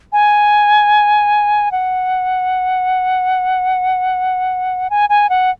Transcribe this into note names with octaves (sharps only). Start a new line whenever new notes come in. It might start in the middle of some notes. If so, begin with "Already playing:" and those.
G#5
F#5
G#5
G#5
F#5